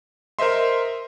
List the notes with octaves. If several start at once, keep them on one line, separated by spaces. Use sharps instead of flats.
A#4 C5 D#5 E5 C6